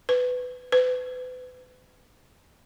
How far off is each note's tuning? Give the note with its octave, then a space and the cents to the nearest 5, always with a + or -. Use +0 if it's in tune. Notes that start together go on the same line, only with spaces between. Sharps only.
B4 +15
B4 +35